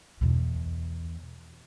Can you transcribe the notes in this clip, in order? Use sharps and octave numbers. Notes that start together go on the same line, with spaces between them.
E2 B2